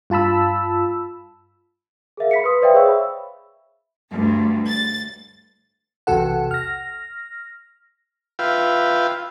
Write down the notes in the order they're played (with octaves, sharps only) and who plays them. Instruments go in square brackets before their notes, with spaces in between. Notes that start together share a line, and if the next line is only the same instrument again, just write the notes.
[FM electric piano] G2 F4 A5 B5 E6
[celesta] G#4 A#4 E5 F5
B5 B6 C#7
B4 C6 D#6
B4 C5 D5 E5 F5 G5
G#4 C5 C#5 F5 C#6 E6
E5 B5
[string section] D2 G2
A6
[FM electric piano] B1 E2 C3 F#4 A4 F#5
F6 A#6
[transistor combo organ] F4 B4 E5 F5 G5